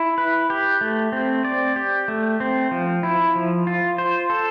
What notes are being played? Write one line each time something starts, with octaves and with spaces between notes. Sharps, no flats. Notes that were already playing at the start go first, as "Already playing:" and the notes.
Already playing: E4
B4
G4
A3
C4
D5
G4
A3
C4
F3
E4
F3
F4
C5
A4